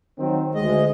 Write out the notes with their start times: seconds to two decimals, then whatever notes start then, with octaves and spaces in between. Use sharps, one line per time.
0.19 D#3 F#3 C4
0.55 D2 G#3 D#5